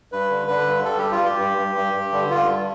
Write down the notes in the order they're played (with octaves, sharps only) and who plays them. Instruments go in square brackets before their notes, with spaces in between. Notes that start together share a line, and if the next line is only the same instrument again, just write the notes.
[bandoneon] G2 B4
D3
D3 B4
G2
G3 A4
G2 G4
F4
G2 G4
G2
G2
G2
G2
D3
G2 F4
G2